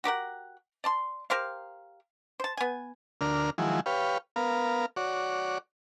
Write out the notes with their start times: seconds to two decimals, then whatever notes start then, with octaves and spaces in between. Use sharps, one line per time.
0.04 F#4 G4 A#4 F#5
0.84 D5 A5 C6
1.30 G4 A#4 C5 F5
2.40 C5 A5
2.57 B3 G#5
3.21 D2 D4 A#4 F6
3.58 D#3 F3 F#3 G#3 E4
3.86 G4 B4 C#5 F5
4.36 B3 A#4 F5
4.96 F#4 C#5 D5